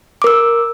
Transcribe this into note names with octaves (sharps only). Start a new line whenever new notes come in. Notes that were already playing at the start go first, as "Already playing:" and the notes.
A#4 D6 E6